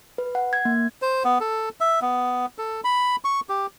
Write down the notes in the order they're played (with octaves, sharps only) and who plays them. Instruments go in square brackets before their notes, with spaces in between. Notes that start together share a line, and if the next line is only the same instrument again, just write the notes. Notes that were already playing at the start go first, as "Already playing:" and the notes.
[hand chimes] B4
F#5
G#6
A#3
[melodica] C5
B3
A4
E5
B3
A4
B5
C#6
G4